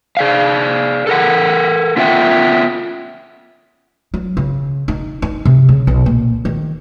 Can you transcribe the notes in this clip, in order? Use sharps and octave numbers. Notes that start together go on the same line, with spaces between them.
G#4 D5 F5
A4 A#4 F#5
B3 C#4 F4 E5 F#5 G5
F#3
C#3
D#4
D#4
C3
C#3
B1
A#2
D#3